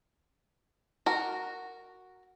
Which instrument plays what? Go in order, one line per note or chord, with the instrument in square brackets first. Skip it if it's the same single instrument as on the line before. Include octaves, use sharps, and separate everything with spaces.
[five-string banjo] F#4 A#4